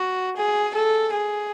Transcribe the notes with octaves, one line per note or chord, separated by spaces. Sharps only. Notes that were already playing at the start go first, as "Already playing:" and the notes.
Already playing: F#4
G#4
A4
G#4